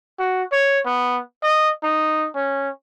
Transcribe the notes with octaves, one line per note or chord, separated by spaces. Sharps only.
F#4
C#5
B3
D#5
D#4
C#4